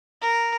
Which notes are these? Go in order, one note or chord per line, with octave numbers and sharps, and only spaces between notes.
A#4